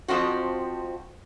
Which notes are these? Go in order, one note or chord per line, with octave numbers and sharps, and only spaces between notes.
F2 G#2 F3 C4 F#4